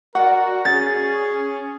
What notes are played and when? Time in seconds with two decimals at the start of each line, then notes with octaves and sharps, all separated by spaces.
0.15 F#4 A#4 D5 F#5
0.65 C#4 G#4 A6